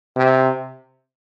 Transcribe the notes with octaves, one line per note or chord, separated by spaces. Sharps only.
C3